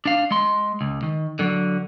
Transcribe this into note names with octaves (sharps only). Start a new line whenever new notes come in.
D4 F5
G#3 C6
C#2
D#3
D3 F#3